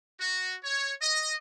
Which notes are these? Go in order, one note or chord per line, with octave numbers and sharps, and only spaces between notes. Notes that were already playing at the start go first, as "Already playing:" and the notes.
F#4
C#5
D#5